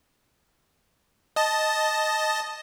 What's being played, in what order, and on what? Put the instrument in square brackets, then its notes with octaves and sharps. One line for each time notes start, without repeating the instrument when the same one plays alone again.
[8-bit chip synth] D#5 A5